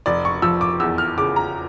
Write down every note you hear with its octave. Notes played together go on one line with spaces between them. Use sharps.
F1 D5
C#6
F3 E6
D6
E2 E6
F6
C#3 D6
A#5